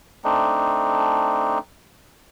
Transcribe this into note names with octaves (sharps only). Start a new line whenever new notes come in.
A3 C4 D4 D#4